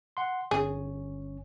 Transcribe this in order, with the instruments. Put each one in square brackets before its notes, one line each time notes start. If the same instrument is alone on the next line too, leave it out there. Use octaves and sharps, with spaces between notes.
[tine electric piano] F#5 C6
[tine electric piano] G1 C#4 [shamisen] G#4